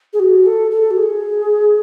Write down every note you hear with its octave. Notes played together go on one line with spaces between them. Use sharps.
G#4
F#4
A4
A4
F#4
G#4